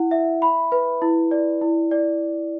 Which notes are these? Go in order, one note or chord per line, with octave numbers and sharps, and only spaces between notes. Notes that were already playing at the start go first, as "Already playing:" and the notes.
Already playing: E4 F#5
E5
B5
B4
E4
D5
E4
D5